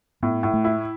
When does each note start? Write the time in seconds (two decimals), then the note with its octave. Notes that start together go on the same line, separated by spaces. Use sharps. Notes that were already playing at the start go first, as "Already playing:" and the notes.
0.23 A2 B3
0.43 A2
0.54 A3
0.64 E4